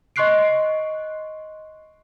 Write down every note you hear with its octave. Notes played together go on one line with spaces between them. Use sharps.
D#5 C6 C#6 F#6 C7 D7